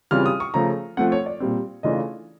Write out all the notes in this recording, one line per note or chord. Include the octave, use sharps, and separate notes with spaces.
C#3 E3 G3 C4 F4 F6
D#6
C#6
C#3 F3 A3 A#5
F3 A3 C4 F#5
C#5
D5
A#2 G3 C4
C#3 E3 A3 D4 F4 D#5